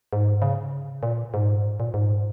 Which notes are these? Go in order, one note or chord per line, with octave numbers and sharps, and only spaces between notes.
G#2
C#3
A#2
G#2
A#2
G#2